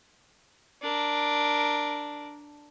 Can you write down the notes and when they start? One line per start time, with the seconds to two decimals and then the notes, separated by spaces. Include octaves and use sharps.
0.82 D4 A#4